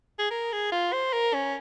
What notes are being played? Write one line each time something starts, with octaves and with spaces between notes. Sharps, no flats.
G#4
A#4
G#4
F4
C5
A#4
C#4